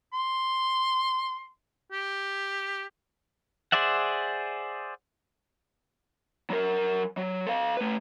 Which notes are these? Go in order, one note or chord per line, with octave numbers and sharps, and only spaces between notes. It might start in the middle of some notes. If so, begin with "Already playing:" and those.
C6
G4
G#4 C5 D5 E5 F#5
F#3 A#4
F#3
A4 F5
A3 B4